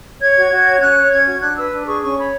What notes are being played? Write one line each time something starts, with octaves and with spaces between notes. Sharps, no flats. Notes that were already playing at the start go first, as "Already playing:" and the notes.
C#5 G#6
F#4
F#4
C#5
C#4 F#6
C#5
C#4 G#6
F#4
D4 F#6
B4 E6
D4
G#4 C#6
C#4 C#6
C#5 B5